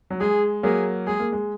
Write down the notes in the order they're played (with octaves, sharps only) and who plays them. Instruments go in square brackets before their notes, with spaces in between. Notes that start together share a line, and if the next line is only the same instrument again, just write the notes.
[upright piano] F#3
[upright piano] G#3 [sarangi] G#4
[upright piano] F#3 A#3 [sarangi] G#4
[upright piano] G#3 [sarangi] G#4
[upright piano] A#3
G#3